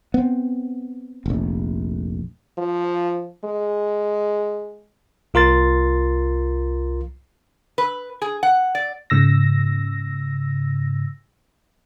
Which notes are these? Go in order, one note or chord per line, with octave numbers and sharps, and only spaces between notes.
B3 C4
F1 A#1
F3
G#3
C2 F4 A#4 C6 A6
B4
G#4
F#5
D5
G#2 C#3 E6 A#6